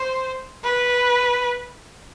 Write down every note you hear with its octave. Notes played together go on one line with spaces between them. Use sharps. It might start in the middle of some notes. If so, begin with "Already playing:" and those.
Already playing: C5
B4